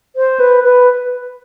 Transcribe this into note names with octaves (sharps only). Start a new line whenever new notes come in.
C5
B4
B4